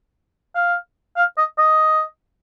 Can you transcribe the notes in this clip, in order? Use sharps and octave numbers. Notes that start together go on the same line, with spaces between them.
F5
F5
D#5
D#5